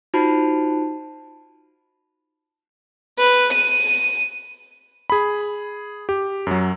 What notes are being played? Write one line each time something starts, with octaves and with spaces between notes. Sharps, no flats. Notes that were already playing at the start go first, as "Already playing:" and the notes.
D#4 F4 F#4 C5 A5 B5
B4
D#7
G#4 B5
G4
F#2 F#3